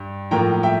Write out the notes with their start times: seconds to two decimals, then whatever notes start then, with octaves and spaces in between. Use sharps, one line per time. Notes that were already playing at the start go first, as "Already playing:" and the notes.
Already playing: G2
0.31 A2 F3 A#3 G5 A#5
0.63 E5 G5